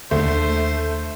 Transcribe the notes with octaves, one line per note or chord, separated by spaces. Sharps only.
D#2 D3 A3 A#3 C5